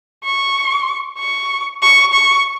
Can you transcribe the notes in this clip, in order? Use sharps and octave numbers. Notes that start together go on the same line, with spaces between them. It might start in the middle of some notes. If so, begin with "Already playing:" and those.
C#6
C#6
C#6
C#6